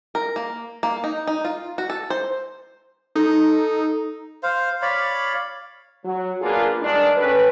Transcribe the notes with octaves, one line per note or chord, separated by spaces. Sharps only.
A#4
A#3
A#3
D#4
D#4
F4
F#4
A4
C5
D#4 A4
C5 F5
C#5 D5 F5 B5
F#3
A#3 B3 D4 F4 G#4
G2 D#3 G#3 D4
C#4 G4 A4 B4